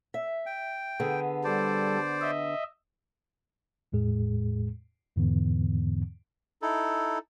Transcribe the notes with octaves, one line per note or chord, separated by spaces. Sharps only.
E5
G5
D3 B3 G#4
G3 A4 C5 D5
D#5 E5
E2 A2 G#3 G#4
E2 G#2 D3 E3 B3
D#4 E4 A4